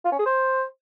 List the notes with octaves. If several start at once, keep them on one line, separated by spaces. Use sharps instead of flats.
F4
C#4
G#4
C5